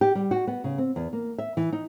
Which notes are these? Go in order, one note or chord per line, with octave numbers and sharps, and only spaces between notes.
G4
G3
F#4
B3
C#3
C4
E2
A#3
E5
E3
D#4